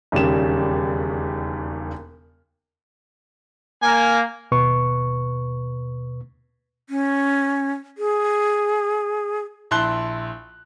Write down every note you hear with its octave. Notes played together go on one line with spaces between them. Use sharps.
E1 D#2 C#3 G3 E7
A#3 G#5
D#2 B2 B4 C#6
C#4
G#4
A#1 E4 A5 C6 F#6 G7